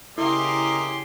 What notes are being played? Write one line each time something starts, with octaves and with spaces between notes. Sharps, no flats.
C#3 A#3 E4 G4 A#4 D#5 G#5 C6